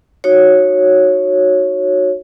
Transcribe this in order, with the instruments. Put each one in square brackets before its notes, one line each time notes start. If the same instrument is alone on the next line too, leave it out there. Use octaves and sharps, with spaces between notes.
[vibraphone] D#4 F#4 C#5